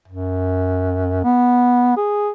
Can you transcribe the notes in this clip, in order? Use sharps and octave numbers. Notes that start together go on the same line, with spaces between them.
F#2
B3
G#4